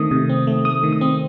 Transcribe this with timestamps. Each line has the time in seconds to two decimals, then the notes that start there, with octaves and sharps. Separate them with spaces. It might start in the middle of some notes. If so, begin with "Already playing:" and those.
Already playing: D#3 A3 C4 D#6
0.11 C3
0.29 C4
0.47 A3
0.65 A3 D#6
0.83 D#3
0.93 D#6
1.01 C4